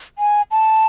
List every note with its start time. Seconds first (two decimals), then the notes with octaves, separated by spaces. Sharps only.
0.18 G#5
0.51 A5